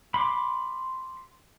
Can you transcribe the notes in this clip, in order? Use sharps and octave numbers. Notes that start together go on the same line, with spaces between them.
B5 C6 D6